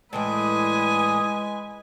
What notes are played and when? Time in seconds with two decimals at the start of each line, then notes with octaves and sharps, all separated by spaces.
0.13 A2 E3 G#3 D4 B4 G#5 D#6